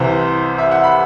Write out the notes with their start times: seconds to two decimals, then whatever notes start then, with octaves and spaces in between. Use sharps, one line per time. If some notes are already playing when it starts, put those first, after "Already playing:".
Already playing: C2 C3 E3 C5
0.58 E5
0.71 F#5
0.84 B5